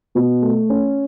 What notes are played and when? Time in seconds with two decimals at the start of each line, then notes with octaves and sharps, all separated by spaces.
0.15 B2
0.42 A3
0.69 C#4